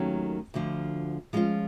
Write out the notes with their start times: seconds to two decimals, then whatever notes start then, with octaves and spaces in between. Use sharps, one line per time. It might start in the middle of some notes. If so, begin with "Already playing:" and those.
Already playing: D#2 D#3 F#3 A3 C#4
0.54 D2 D3 F3
1.33 F3 G#3 C#4 F4